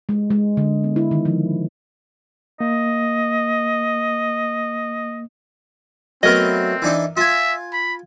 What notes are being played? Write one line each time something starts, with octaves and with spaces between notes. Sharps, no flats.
G#3
G#3
D3
B3
E4
D#3
F3
A#3 D#5
F#3 A3 B3 C4 A#4 D#5
E3 D4 D#4
F4 E5 G#5
B5